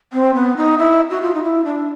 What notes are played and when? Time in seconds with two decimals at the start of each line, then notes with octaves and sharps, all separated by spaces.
0.13 C4
0.35 B3
0.57 D#4
0.78 E4
1.10 F#4
1.22 F4
1.34 D#4
1.43 E4
1.65 D4